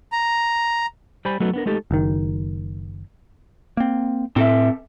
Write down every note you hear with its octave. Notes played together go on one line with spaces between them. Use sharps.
A#5
G3 C5 G#5 B5
F#3 A3 B3 D#4 F#4 A4
B3 D4 A#4
G#3 A3 D#4 G4 A4
F#1 D#3
A#3 C4
A2 C4 A4 E5